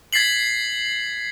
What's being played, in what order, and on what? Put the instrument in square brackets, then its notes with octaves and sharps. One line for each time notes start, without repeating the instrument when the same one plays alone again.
[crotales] G#6 A6 B6 C7 F#7